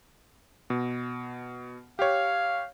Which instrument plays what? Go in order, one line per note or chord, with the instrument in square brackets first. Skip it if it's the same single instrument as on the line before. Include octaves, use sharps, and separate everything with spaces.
[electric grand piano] B2
[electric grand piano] G4 C#5 [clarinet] F5